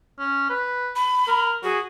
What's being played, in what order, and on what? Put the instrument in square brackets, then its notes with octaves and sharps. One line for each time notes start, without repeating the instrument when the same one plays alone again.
[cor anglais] C#4
B4
[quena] B5
[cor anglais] A#4
[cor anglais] F#4 [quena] G#4